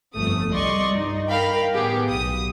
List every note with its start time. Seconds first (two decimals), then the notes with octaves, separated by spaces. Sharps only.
0.16 G1 F2 A3 D#6
0.53 C2 G3 D5 D#5 C6 C#6
0.94 G2 D#4
1.29 A#4 F5 G5 B5
1.73 A2 D#3 B3 G4 G#4
2.08 B1 D#6